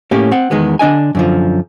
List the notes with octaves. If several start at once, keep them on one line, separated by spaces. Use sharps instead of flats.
A2 A#3 C#4 G4
C4 F#5
E2 D#3 G#3 B3
D3 D4 D#5 G#5
F#2 D3 F3